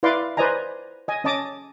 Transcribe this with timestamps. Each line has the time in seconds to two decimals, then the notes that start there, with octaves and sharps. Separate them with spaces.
0.03 E4 B4 D5 F5 C6 D6
0.37 B4 C5 D5 D#5 G#5 A#5
1.08 D#5 G#5
1.24 C#4 D#5 A5 D6 D#6